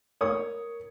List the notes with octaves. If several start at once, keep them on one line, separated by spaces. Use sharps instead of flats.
A#4 C#5 D#6